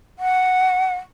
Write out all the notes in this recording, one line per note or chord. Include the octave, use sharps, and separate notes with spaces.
F#5